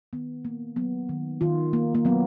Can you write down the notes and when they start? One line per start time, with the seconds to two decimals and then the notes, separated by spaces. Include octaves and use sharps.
0.13 D#3 B3
0.45 A#3
0.76 F#3 B3
1.09 D#3
1.41 D#3 F4
1.73 A#3
1.95 A#3
2.05 F#3 B3